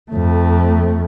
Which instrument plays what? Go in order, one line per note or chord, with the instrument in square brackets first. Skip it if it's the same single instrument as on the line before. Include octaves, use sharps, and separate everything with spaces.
[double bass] F2 A3